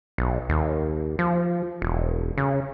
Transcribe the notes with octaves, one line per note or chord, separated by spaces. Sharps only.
B1
D#2
F3
E1
C#3